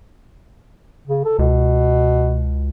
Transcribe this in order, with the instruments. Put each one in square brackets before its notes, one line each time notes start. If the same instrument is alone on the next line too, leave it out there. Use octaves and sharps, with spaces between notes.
[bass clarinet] C#3
A4
[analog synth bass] C#2 [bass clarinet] B2